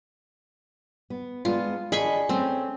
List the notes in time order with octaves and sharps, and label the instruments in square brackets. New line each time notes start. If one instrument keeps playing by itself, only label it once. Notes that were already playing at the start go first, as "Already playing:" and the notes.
[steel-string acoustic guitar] B3
[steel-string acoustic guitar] G#3 B3 D4 [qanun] F4
[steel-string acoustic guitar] D4 D#5 [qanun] G#4 B5 C#6
[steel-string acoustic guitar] A3 C#4 [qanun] C4